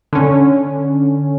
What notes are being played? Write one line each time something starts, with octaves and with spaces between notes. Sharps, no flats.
D3 C#4